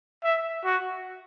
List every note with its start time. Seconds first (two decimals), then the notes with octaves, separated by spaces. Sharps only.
0.24 E5
0.65 F#4